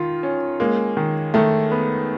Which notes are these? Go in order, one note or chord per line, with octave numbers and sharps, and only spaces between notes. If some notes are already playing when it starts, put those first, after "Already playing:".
Already playing: D#3 F4
C#4
G#3 A#3
D#3
D#3 A3
B3